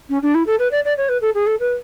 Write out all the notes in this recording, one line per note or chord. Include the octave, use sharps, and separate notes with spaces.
C#4
D4
E4
A4
B4
D5
D5
C#5
B4
A4
G#4
A4
B4